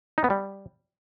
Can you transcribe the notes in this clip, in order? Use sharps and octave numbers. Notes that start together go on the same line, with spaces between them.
D#4
B3
G3